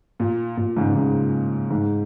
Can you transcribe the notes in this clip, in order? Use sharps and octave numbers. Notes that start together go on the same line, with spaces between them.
A#2
A#2
G#2 C#3
G#2 C#3
G#2